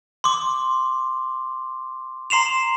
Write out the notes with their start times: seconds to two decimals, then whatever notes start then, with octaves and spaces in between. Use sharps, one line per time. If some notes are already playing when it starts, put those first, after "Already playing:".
0.24 C6 D6
2.30 A#5 C6 C7 E7 F7